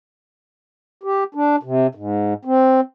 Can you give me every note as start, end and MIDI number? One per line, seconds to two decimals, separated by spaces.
1.03 1.24 67
1.35 1.56 62
1.63 1.87 48
1.95 2.34 44
2.45 2.81 60